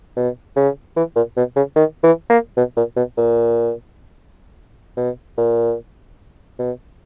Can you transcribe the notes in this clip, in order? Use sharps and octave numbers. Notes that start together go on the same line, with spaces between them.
B2
C#3
E3
A#2
B2
C#3
D#3
E3
A#3
B2
A#2
B2
A#2
B2
A#2
B2